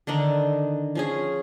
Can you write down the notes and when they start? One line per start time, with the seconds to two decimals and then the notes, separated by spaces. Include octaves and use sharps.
0.07 D3 D#3 D4 D#4
0.95 F3 C#4 G#4